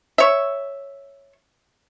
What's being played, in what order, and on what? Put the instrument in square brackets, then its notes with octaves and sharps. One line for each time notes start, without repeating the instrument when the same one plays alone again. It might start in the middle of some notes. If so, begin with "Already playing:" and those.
[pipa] C#5 E5